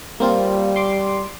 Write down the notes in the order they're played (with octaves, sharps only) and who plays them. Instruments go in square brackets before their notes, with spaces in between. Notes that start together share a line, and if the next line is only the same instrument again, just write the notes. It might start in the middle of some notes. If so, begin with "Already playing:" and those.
[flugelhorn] G3 [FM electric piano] A#3 C4 F4
[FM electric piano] C6 D6